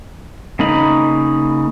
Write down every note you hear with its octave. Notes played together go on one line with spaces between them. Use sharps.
C#3 A#3 D#4 B5